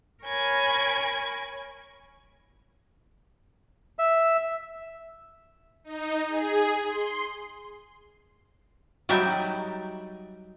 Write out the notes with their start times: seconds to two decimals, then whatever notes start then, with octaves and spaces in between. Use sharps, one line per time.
0.23 A#4 C#5 G#5 B5 G#6
3.99 E5
5.84 D#4
6.28 G#4
6.88 C6
9.09 F#3 G3 D#4 E5 G5